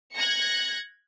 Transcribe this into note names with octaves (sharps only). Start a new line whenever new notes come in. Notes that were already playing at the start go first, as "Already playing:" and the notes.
F#6 G#6 A#6 C#7